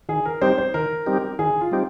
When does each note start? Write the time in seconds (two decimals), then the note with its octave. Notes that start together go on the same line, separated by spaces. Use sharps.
0.09 D#3 G#4
0.26 A#4
0.41 G3 C4 D#4 G4 C5
0.58 C5
0.74 D#3 A#4
1.06 G3 C4 D#4 G4
1.39 D#3 G#4
1.61 F4
1.72 G3 C4 D#4 G4